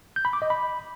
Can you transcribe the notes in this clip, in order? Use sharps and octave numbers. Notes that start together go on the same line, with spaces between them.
G6
B5
D6
D#5
B5